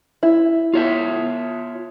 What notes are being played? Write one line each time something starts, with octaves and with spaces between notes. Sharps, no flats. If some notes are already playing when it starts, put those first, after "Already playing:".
E4
F4 C#5 E5